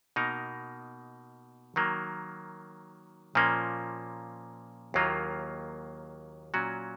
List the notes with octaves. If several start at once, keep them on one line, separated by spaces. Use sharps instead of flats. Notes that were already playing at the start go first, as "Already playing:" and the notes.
B2 A#3 D#4 A#4
D#3 F#3 A#3
A#2 F3 A#3 C#4
D#2 D#3 F#3 A#3 F4
A#2 F#3 C#4 F#4